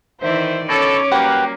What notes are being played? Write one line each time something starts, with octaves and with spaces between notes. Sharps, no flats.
D#3 E3 C5 D5 E5
B2 D3 C#4 A4 C#5 D6
F#3 G3 A#3 G4 B4 F#5